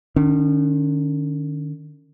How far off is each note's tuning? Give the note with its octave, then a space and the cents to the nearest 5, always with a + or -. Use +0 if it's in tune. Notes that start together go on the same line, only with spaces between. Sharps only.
D#3 -40 C#4 +20